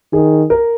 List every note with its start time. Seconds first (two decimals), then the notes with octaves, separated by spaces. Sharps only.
0.12 D#3 G#4
0.50 A#4